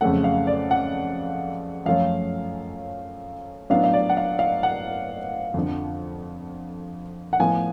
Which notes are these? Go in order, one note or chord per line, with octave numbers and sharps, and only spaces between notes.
F2 C#3 F#3 A3 C#4 F#5
F5
D5
F#5
F#2 F3 A3 C#4 F4 F5
A2 F#3 B3 D4 F4 F5
F5
D5
F#5
F5
F5
F#5
F2 D3 F3
F#5
A2 F3 B3 F4 G#5